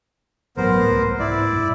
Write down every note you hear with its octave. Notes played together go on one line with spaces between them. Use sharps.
A1 G2 F#3 B3 A#4 C5
C2 G#2 A3
E4 D5
G2 A#2